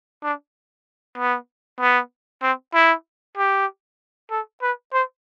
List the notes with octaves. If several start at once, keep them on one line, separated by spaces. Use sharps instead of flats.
D4
B3
B3
C4
E4
G4
A4
B4
C5